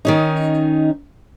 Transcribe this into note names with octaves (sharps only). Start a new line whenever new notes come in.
D#3 C#4 D#4